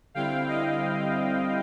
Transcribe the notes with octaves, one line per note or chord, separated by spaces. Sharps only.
D3 G3 C4 E4 F5 G5
D#5 F5